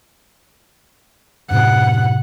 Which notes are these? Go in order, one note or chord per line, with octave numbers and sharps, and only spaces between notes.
F#2 A2 C3 F#5